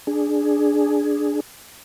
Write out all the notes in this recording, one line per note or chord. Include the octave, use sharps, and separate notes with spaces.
D4 G#4